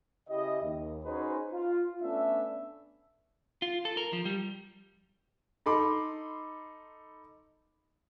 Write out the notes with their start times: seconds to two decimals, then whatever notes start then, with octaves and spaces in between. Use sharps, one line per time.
0.29 C#3 E4 G4 D#5
0.63 D#2
1.05 C#4 D#4 F#4 G#4 B4 C5
1.52 F4
2.02 A3 B3 C#4 D4 E5
3.62 F4
3.85 A4
3.97 A#4
4.13 F3
4.25 G3
5.66 D#4 A4 B5 C6 D6